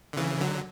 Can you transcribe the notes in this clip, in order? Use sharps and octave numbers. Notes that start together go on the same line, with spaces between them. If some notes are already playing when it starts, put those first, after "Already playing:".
D3
C#3 E3
D3 F#3